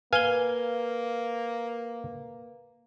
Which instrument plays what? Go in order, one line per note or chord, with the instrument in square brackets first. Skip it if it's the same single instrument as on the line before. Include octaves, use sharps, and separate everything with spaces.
[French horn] A#3 [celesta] B4 G7 [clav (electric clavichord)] F5 G#5